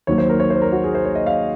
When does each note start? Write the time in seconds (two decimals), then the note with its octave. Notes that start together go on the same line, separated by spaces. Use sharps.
0.07 D#2 D#3 F#3 A#3 C#5
0.18 C5
0.29 A#4
0.40 C#5
0.50 C5
0.62 A#4
0.72 F#4
0.84 G#4
0.95 C5
1.05 C#5
1.15 D#5
1.26 F5